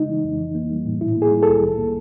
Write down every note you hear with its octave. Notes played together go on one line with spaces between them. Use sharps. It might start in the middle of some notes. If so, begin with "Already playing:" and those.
Already playing: C#3 G#3 D#4
E3
F2
E3
A#3
G3
A2
A#2 E4
A#3 G#4
G3
C2 A4
D#3
A#3